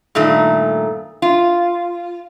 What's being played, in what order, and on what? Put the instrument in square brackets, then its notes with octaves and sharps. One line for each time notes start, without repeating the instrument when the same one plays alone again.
[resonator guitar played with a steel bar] G2 A#2 D#3 A3
F4